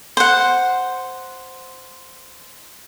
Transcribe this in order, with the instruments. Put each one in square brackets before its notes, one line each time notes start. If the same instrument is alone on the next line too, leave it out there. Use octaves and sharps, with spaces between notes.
[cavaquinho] C5 F#5